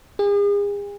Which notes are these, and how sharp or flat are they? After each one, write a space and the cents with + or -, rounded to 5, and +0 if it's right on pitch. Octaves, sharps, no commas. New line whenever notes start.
G#4 -40